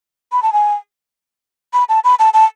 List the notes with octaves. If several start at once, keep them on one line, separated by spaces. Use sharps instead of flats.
B5
A5
G#5
B5
A5
B5
A5
A5